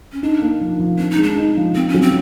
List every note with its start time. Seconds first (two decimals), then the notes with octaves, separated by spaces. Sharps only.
0.12 C#4
0.23 D4 D#4
0.42 A#3
0.61 F3
0.79 F3
0.98 C4 D4
1.11 D#4
1.17 G#3
1.23 D4
1.37 D#4
1.56 F3
1.75 B3 C4
1.89 C#4
1.94 F#3
2.02 C4